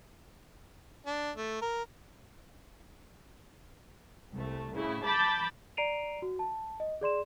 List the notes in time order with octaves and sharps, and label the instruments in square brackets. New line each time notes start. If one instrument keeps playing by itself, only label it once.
[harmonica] D4
A3
A#4
[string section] C2 A3
A2 C#3 E4
A5 B5 D6 G6 A6
[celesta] D5 A#5 C7 D7 D#7 F7
F#4
A5
D#5
G#4 D5 C6 E7